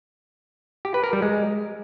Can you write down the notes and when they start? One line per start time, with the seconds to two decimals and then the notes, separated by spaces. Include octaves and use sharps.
0.85 G4
0.94 B4
1.04 A#4
1.13 G3
1.22 G#3